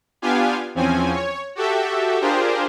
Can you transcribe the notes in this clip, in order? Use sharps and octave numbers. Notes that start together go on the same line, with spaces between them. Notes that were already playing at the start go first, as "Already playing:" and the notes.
B3 D4 F4 G4 F5 G#5
E2 F3 C4 C#4 G#5
C#5
F#4 G4 A4 E5
D4 F4 G4 G#4 A#4 C5